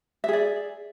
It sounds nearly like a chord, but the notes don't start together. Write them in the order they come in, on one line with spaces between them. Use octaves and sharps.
E5 G#4 D5